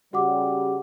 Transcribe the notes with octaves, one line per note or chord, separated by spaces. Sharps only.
C#3 G3 F#4 F#5 D6